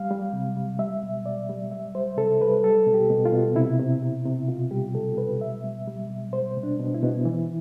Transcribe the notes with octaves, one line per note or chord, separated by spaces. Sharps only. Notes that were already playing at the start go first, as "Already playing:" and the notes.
Already playing: G3 F5
G3
C3
G3
G3 E5
B2
G3 D5
G3
G3 E5
G3 C5
C3 A4
G3 B4
G3 A4
B2
G4
B2
F4
B2
C3 E4
C3
C3
C3
B2 F4
G3 G4
B2 A4
G3 B4
B2 E5
G3
G3
B2
G3 C5
B2
D4
B2
E4
B2
E3